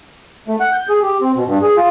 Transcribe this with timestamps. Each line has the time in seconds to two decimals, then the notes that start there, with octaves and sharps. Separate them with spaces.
0.48 A3
0.60 F#5
0.73 G6
0.89 G#4
1.02 G4
1.21 C4
1.36 B2
1.47 G2
1.62 G#4
1.77 F4